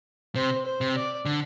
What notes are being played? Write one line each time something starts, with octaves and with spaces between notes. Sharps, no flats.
C3 C5
C5
C3
D5
D3